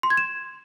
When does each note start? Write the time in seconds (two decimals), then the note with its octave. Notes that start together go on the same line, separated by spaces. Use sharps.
0.03 C6
0.10 G#6
0.17 E7